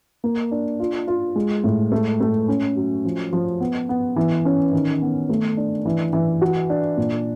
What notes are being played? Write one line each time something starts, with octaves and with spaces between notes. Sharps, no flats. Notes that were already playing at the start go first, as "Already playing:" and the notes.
A#3
D4
F4
F4
G#3
A2
A3
A3
C#4
F#3
F3
F3
B3
B3
E3
C#4
D#3
B3
A3
D4
E3
E3
F#4
D4
A#2